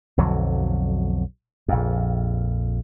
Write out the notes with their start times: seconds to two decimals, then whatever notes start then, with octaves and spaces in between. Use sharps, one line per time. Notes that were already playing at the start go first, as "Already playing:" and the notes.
0.17 B1 F2 D3 F#3
1.68 A#1 F2